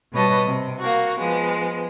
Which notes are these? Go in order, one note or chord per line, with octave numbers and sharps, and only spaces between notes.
B2 G3 B4 C#5 D#5 A5
C3
A#3 F#4
F3 G#3 B3